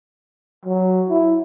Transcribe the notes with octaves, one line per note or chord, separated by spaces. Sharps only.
F#3
E4